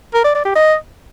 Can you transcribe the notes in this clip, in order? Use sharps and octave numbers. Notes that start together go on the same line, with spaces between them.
A#4
D5
D5
G4
D#5